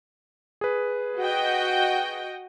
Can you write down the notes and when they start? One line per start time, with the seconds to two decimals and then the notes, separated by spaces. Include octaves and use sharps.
0.61 G#4 B4
1.19 F#4 D#5 G5